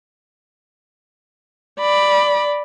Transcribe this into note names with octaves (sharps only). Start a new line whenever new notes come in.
D5 B5